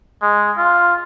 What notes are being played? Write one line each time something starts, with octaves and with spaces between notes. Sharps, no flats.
G#3
F4